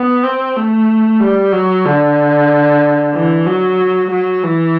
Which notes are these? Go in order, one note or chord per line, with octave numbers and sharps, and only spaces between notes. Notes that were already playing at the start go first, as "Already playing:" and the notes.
Already playing: B3
C4
A3
G3
F#3
D3
E3
F#3
F#3
E3